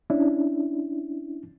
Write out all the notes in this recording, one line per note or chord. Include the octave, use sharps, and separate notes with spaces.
C#4 D4 E4